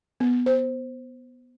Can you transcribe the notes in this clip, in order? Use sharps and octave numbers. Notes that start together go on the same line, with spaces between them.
B3
C5